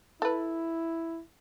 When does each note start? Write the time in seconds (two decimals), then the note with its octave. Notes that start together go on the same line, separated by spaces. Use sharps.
0.22 E4 A4 B4